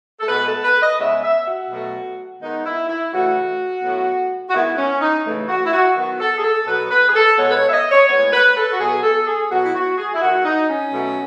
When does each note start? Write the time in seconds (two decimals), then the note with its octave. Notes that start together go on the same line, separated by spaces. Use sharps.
0.20 A4
0.28 B2 G#3 B3 B4
0.46 A4
0.63 B4
0.82 D#5
0.99 C#3 G#3 B3 E5
1.24 E5
1.46 F#4
1.71 B2 F#3 A3
2.41 D#3 G#3 B3 D#4
2.65 E4
2.88 E4
3.12 C#3 E3 A3 F#4
3.82 A2 F#3 B3
4.49 F#4
4.54 D#3 G#3 B3 E4
4.78 C#4
5.01 D#4
5.25 C#3 E3 A3
5.48 F#4
5.65 E4
5.72 F#4
5.95 D#3 F#3 B3 F#4
6.20 A4
6.38 G#4
6.43 A4
6.67 B2 F#3 B3 B4
6.90 B4
7.08 G#4
7.15 A4
7.37 B2 G#3 B3 C#5
7.49 B4
7.55 C#5
7.68 E5
7.73 D#5
7.91 C#5
8.08 A2 G#3 B3 C#5
8.32 B4
8.56 A4
8.72 F#4
8.79 B2 F#3 B3 G#4
9.03 A4
9.27 G#4
9.51 B2 F#3 B3 F#4
9.64 E4
9.74 F#4
9.98 G#4
10.14 E4
10.21 D#3 A3 F#4
10.45 D#4
10.68 C#4
10.92 B2 F#3 A3